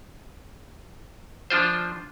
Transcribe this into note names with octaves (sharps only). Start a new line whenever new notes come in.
F3 D4 F4 C5